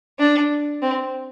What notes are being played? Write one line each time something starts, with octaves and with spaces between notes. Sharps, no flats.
D4
C4